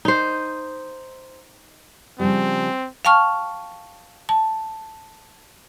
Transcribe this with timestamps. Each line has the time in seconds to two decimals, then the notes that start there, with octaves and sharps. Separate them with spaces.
0.05 D#4 C5
2.20 C#3 F3 G3 C4
3.05 F5 G5 A5 C#6 F6
4.29 A5